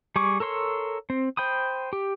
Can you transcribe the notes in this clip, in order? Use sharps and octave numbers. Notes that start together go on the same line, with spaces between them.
G3 G#4 C#6 D6
A4 A#4 C#5 C6 E6
C4
C5 G5 B5 D#6
G4